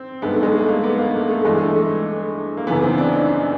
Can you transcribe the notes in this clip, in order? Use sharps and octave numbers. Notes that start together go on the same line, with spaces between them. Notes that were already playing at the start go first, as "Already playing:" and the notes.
Already playing: C4
G2 D#3 G#3 B3
A3
G#3
A3
A#3
B3
A#3
A3
A3
G2 E3 G#3 A3
A3
A3
A#3
F#2 C#3 E3 B3
C4
D4
D#4